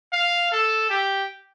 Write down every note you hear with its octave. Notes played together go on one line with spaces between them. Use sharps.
F5
A4
G4